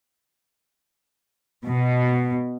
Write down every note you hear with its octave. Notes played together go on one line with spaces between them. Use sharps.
B2